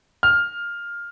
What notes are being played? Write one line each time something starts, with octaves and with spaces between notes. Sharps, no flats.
F6